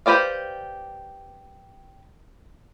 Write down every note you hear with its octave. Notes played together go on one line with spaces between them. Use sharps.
G4 B4 C5 D5 F5